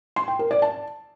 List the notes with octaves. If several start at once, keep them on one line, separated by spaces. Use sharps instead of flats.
C6
G5
A#4
D5
A5